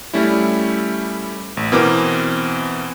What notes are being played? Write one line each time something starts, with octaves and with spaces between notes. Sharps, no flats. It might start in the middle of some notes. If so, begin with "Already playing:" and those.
G3 A3 C#4 E4
A1
B2 E3 C4 A#4 D6